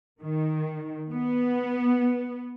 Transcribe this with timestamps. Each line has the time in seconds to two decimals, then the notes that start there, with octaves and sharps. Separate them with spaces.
0.21 D#3
1.10 B3